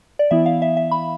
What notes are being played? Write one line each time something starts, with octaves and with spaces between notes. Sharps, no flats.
D5
E3 B3 E4 E5
F5
E5
E5
B5